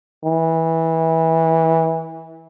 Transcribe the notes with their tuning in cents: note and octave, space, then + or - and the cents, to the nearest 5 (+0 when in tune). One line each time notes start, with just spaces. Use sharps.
E3 -20